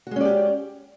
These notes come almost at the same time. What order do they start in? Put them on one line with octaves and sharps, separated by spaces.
F#4 G#3 C#4 D5 G4